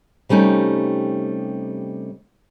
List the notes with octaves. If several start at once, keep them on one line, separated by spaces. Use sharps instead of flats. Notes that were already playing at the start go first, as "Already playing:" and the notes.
C3 G3 A3 C#4 D#4